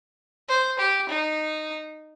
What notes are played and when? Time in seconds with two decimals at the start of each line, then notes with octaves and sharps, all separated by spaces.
0.49 C5
0.79 G4
1.09 D#4